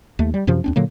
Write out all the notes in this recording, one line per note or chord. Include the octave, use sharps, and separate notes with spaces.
D#2 A3
G3
F#2 C3 F3
D#2 C4 D4
A#2 D3 F#3 A#3